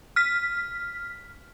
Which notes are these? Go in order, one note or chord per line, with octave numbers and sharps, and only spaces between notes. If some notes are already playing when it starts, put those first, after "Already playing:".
F6 B6